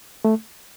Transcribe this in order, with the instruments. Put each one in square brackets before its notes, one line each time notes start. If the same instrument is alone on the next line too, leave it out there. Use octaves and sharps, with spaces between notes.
[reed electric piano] A3